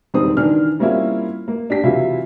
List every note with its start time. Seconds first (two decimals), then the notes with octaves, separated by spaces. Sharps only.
0.14 E1 D#3 G3 C4 D#6
0.37 D#3 E3 D4 F6
0.79 G3 A#3 C4 C#4 E4 F4
1.48 A#3
1.70 D4 G4 B6
1.84 C3 E3 F#3 E4 F4